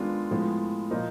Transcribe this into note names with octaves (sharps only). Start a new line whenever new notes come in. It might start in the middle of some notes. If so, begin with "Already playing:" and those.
Already playing: D#3 G#3 B3 D4 F4
A2 F3 G#3 B3
A#2 F3 A#3 D#4